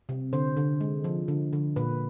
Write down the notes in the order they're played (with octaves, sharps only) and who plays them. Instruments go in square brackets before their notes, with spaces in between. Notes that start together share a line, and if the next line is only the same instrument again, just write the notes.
[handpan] C3
D3 C5
D3
G#3
F3
D3
D3
A#2 B4